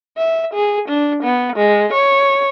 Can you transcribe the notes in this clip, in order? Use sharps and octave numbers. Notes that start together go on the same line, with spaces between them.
E5
G#4
D4
B3
G#3
C#5